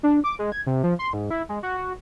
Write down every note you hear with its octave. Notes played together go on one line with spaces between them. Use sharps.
D4
D6
G#3
G#6
C3
F3
C6
G#2
E4
G#3
F#4
F#4